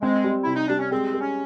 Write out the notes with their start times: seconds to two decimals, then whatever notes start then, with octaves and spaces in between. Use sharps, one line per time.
0.02 G#3 C4
0.24 G3
0.44 C3 E4
0.56 D#4
0.68 G3 D4
0.79 C#4
0.92 G#3 C4
1.14 G#3
1.21 C#4